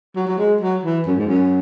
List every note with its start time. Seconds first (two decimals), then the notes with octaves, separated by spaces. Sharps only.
0.16 F#3
0.27 F#3
0.38 G#3
0.61 F#3
0.84 E3
1.06 F#2
1.17 G#2
1.27 F#2